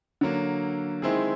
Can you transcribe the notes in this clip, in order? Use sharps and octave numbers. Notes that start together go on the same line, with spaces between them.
D3 F#3 A#3
D#3 G#3 C4 E4 G#4